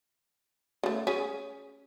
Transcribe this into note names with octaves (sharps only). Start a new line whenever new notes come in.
C#3 A3
C#4 G#4